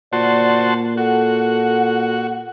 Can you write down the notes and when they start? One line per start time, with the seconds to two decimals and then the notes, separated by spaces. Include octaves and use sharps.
0.13 A#2 F#4 C5 D5 A5
0.97 F#4 A4 F#5